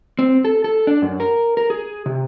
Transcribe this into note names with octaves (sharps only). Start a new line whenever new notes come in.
C4
A4
A4
D4
F#2
A#4
A#4
G#4
C3